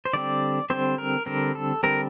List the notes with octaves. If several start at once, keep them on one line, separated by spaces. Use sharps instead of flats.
C5
D3 G3 C4 D5
D3 G3 C4 C5
A#4
D3 G3 C4 A#4
A4
D3 G3 C4 A#4